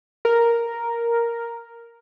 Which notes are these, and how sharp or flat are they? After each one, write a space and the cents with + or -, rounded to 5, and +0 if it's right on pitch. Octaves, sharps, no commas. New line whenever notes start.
A#4 +0